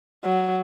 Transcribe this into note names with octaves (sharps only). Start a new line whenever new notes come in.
F#3